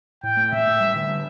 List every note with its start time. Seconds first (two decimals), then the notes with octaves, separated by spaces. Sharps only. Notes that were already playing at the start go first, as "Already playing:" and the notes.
0.23 A2 G5
0.37 A3
0.52 A2 E5
0.66 A2
0.81 G3
0.95 D3
1.09 G3